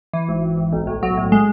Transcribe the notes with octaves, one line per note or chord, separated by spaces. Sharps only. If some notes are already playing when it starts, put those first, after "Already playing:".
E3
G#1
G#1
G#1
B1
A2
F#3
A2
G#3